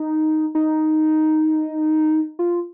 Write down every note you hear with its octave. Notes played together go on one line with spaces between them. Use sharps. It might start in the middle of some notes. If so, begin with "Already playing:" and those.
Already playing: D#4
D#4
F4